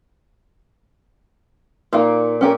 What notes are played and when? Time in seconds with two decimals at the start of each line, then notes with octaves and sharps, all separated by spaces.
1.93 A#2 A#3 D#4 F5
2.41 C#4 G4 A#4